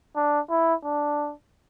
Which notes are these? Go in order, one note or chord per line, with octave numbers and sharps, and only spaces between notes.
D4
E4
D4